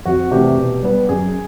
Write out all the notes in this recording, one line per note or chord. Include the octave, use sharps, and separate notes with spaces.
F2 F#4
C3 E3 A3 D4 G4
B2
G3 B3 D4
F#2 G#4